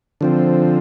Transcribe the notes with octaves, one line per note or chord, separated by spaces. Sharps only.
D3 F3 C4